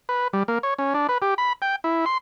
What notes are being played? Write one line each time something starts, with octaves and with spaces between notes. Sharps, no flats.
B4
G3
A#3
C#5
C#4
D4
B4
G4
B5
G5
E4
C6